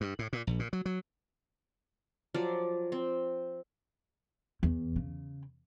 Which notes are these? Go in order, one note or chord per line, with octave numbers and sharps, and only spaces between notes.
G2
A2
A#2
A#1
A#2
F#3
F#3
F3 F#3 D5
C4
E2
C#3